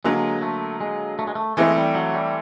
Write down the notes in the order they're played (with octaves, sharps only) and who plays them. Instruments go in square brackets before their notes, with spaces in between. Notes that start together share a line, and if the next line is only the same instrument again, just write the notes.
[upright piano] D3 F#3 A#3 [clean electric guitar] G#3
[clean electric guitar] A3
G#3
A3
G#3
A3
[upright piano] E3 A3 C4 [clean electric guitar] G#3
[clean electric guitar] G3
F#3
G3